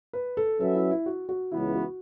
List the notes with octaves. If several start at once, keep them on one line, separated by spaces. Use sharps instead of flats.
B4
A4
F#3 C#4 F#4 A4 B4 E5
E4
E4
F#4
F#4
C#2 C#3 E3 B3 E4
F#4